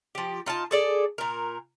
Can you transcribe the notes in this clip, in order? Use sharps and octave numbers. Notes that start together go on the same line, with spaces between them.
F3 G4
D#4 F4 G5 A5
G#4 A4 D5
A#2 A#4